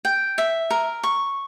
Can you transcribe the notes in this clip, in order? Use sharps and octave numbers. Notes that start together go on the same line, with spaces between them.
G5
E5
A#4
C#6